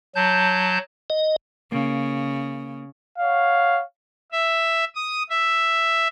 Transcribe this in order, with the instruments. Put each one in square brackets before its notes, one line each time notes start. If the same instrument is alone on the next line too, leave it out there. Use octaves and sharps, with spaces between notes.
[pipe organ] F#3 A5 G6
[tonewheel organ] D#5
[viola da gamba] C#3 [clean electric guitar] A#3
[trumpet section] C#5 F5 F#5
[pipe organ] E5
D#6
E5